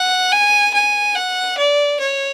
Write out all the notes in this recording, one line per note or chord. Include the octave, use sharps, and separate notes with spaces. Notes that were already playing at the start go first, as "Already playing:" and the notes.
Already playing: F#5
G#5
G#5
F#5
D5
C#5